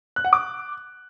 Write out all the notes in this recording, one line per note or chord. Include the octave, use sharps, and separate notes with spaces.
F#6
F#5
D6